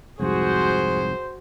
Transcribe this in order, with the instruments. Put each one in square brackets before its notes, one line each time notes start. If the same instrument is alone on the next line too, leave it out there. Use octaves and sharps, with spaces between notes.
[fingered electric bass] C2 F2 G#2 [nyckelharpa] F#4 G#4 [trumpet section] C5